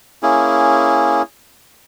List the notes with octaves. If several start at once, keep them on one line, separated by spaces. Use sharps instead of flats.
A#3 C#4 E4 G#4